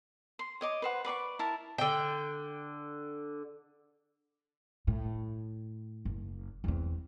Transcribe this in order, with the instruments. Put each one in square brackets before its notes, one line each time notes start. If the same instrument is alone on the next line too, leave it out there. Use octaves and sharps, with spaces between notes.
[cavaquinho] C6
C#5 D#5 D6
B4 C5 F#5
B4 D5 B5 C#6
E4 A#4 A5
[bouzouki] D3 G5
[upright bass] A2
F#1
E2 C4